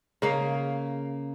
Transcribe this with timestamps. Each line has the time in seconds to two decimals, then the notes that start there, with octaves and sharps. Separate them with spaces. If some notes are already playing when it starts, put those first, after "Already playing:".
0.22 C#3 A#3 F5